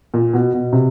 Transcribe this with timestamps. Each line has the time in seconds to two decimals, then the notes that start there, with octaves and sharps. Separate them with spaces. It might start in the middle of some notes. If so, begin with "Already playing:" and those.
0.14 A#2
0.34 B2
0.54 B2
0.73 C3